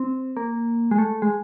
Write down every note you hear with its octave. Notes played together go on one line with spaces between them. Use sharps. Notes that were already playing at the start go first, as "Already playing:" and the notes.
Already playing: C4
A#3
G#3
A3
G#3